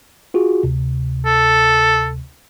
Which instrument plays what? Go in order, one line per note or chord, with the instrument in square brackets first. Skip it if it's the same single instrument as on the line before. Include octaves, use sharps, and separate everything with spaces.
[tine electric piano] F4 F#4 G#4
D2 C3
[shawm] A4